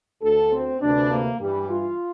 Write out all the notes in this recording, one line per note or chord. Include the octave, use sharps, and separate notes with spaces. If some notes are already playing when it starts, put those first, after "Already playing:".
D2 D3 A4
C4
D2 C3 E3 D4
A#3
G2 E3 G3
F4